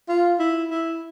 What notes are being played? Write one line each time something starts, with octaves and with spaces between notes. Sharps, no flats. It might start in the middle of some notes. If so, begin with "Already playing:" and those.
F4
E4
E4